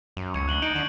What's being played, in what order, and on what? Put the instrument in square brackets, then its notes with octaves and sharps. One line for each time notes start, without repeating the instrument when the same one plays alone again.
[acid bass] F#2
[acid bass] C#2 [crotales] C#6 G#6 C#7
[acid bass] D2 [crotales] F#6 F#7 G7
[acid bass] D#4 [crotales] G6 C#7 D7
[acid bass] D3